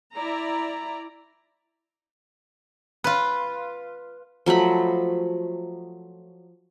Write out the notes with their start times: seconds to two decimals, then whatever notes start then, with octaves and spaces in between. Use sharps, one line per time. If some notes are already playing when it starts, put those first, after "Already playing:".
0.16 E4 D5 A#5
3.04 F4 B4
4.46 F3 F#3 A3 B5